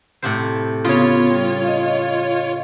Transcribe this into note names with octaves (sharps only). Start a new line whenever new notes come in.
A2 C3 C5
C#3 B3 F4 C#5
G3
D#5 F5